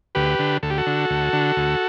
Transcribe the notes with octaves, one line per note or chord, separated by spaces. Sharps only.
D2 G4 B4
D3
D2 A4
G4
F#4 A4
D3
D2
D3
D2